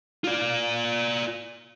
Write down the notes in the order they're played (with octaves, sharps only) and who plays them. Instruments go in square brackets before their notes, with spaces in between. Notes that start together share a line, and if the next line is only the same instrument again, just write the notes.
[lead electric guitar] F4 D5